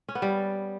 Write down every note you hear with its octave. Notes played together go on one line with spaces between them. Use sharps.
C#4
B3
G3